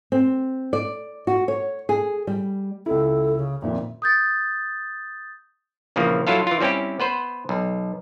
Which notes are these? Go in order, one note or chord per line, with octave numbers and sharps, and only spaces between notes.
C4
D5
F#4
C#5
G#4
G3
C#2 E4 A4
C#3
F2 A#2 D#3 E5
D#6 G6 A6
A#1 C#3 E3 F3 A#3
F#3 E4 F4 A4 F5
E3 F4
G3 C4 C#4 E4 G4
B3 B4 C5
B1